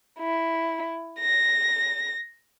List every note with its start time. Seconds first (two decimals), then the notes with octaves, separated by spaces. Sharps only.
0.19 E4
1.19 A#6